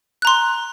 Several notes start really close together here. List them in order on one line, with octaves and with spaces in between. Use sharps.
F#6 A#5 C6